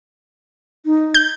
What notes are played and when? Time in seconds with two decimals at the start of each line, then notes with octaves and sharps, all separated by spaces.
0.85 D#4
1.14 G6